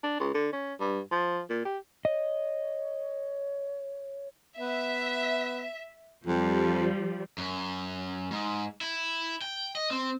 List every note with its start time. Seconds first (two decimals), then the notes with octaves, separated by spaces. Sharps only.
0.03 D4
0.20 C#2
0.34 D3
0.53 C#4
0.80 G2
1.12 F3
1.50 A#2
1.65 G4
2.05 C#5 D#5
4.59 B3 E5
6.27 F2 F3 G3
7.38 F#2
8.31 G#2
8.81 E4
9.42 G5
9.75 D#5
9.91 C4